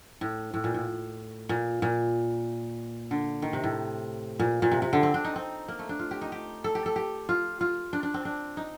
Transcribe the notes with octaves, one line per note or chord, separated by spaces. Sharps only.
A2
A2
A#2
A2
A#2
A#2
D3
D#3
C3
A2
A#2
A#2
C3
C3
D3
C4
D4
D#4
C4
A#3
A3
D4
F4
G4
D#4
G4
A4
G4
A4
G4
F4
F4
D4
D4
C4
D4
D#4